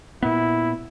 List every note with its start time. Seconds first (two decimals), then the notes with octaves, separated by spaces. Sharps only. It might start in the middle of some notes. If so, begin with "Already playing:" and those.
0.23 A#2 B3 E4